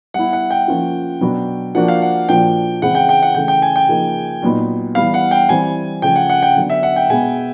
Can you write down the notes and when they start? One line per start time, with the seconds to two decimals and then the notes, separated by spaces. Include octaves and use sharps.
0.14 G3 B3 E4 F#5
0.33 F#5
0.51 G5
0.68 F3 A#3 C#4 F4
1.21 B2 F#3 B3 D4 F#4
1.75 F3 A#3 D4 F#4 F#5
1.88 F5
2.02 F#5
2.29 A#2 F3 A#3 D4 F#4 G5
2.82 C#3 E3 G#3 C4 E4 F#5
2.95 G5
3.09 G5
3.23 F#5
3.35 C#3 E3 A3 C#4 G5
3.48 G5
3.62 G#5
3.76 G5
3.89 C#3 F3 A#3 D#4
4.42 A#2 F#3 B3 D#4
4.95 E3 G3 B3 F5
5.14 F#5
5.31 G5
5.49 E3 G3 C4 G#5
6.02 C#3 F3 A3 C#4 G5
6.16 F#5
6.30 F#5
6.43 G5
6.56 D3 F#3 B3 D4
6.70 E5
6.83 F#5
6.96 G5
7.09 B2 G#3 B3 G#5